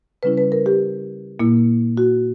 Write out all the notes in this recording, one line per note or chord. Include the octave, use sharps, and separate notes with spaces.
C#3 G3 C#4 E4 B4
B4
A#4
G4
A#2 A#3 E4
F#4